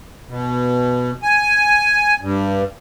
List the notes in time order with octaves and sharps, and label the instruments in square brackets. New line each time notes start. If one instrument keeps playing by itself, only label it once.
[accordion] B2
G#5
G2